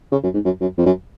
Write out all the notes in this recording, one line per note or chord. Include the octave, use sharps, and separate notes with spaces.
C#3
F#2
G#2
F#2
F#2
F2
F#2